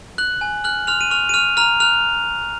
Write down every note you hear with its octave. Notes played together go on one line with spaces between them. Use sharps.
F#6 F#7
G#5
F6 F#6 F#7
C6 F6 F7
D#7
C#6 F6 F7
D#7
C#6 F6 F7
A#5 F6 F7
F6 F#6 F7